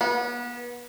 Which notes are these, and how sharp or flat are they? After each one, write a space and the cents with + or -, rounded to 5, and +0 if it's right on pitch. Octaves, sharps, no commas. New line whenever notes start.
B3 -30